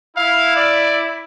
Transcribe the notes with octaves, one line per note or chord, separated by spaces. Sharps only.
E4 F5
D5